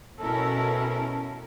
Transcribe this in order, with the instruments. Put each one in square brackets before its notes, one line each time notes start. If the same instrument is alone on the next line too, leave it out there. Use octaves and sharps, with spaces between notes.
[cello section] B2 C#4 E4 A4 A#4